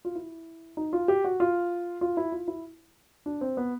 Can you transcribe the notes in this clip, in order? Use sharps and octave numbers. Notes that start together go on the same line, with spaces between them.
F4
E4
D#4
F4
G4
F#4
F4
F4
E4
F4
E4
D4
C4
B3